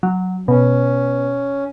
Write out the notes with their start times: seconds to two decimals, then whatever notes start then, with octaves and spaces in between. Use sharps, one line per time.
0.03 F#3
0.48 B2 C#4